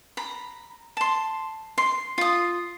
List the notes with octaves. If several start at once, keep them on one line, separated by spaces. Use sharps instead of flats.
A#5 B5
A5 C6
C6
F4 D#6